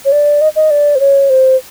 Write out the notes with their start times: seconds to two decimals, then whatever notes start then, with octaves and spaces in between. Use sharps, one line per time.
0.05 C#5
0.12 D5
0.41 D#5
0.56 D#5
0.71 D5
0.95 C5
1.00 C#5
1.30 C5